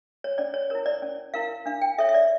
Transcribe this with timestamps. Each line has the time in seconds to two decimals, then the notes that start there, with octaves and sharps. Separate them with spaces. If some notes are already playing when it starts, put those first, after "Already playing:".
0.24 C#5
0.38 C#4 D5
0.54 C#5
0.70 E4 A#4 C#5
0.86 D5
1.02 C#4
1.34 E4 A#4 F5
1.66 D4 F5
1.82 G5
1.98 A4 C#5 E5
2.09 E5
2.14 D5